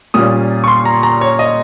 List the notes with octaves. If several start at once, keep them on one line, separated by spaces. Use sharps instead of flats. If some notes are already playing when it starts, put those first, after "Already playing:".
A#2 G3 C#4 F4 D#6
C#6
C6
A#5
A#5
C#5
D#5